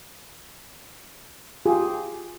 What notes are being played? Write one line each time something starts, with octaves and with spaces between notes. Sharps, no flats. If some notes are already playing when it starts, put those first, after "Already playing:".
F4 G4 G#4